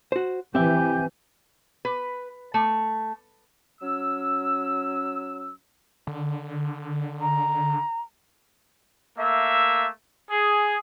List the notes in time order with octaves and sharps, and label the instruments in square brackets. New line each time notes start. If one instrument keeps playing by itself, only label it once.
[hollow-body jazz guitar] F#4 C5
[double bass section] E3 [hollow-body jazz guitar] C4 E5 [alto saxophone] G4 [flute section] G#5 G6
[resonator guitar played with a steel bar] B4
A3
[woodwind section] F#3 C#4 E6
[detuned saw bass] D3
[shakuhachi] A#5
[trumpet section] A3 A#3 E5
G#4